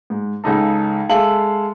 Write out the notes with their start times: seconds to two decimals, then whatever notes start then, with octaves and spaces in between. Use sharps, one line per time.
0.10 G#2
0.44 C#2 C#3 D#4 A4
1.09 G#3 A4 E5 F5 F#7